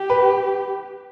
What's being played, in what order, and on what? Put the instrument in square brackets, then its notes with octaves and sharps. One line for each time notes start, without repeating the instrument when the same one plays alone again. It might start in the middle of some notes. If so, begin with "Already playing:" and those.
Already playing: [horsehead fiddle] G4
[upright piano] B4